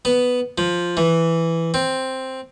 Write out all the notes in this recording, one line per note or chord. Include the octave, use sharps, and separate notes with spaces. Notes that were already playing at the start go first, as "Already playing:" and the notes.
B3
F3
E3
C4